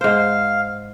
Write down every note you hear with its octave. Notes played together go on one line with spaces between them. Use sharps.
G#2 C5 F5